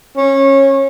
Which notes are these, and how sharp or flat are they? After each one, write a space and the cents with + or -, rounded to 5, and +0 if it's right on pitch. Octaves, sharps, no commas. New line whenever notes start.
C#4 -20